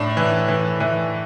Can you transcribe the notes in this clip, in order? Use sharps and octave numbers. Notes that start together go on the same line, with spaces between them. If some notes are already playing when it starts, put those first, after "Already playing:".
Already playing: A2 D4
E3
E3
E3